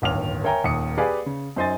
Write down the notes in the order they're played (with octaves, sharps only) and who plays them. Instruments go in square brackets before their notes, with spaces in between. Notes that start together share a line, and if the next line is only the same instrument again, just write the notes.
[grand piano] D1 G1 D#2 C#5 F6 F7
A#4 C#5 E5 G5 G#5 A#5
D#1 D#2 D#6 C#7
G4 G#4 B4 D5 F5 G#5
C#3
F#2 D#4 C5 D#5 G#5 A6